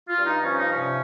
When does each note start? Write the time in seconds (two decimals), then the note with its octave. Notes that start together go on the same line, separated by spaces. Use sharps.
0.08 F4
0.17 G2
0.26 D#4
0.44 F3 C#4
0.57 D#4
0.70 C3 C#4